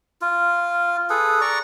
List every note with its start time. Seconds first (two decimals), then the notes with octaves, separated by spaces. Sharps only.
0.22 F4
1.10 G#4 A4 B4
1.41 D5 A#5 C#6